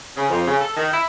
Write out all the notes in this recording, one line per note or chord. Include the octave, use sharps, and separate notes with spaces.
C#3
F2
C#3
A4
D#3
E4